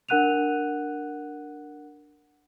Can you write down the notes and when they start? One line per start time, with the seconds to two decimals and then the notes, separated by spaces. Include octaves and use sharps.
0.09 D4 A#4 F#5 F#6 D#7 F7